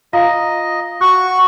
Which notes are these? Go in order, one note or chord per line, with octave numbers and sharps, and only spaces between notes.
F4 D#5 F5 A#5
F#4 C#6 F#6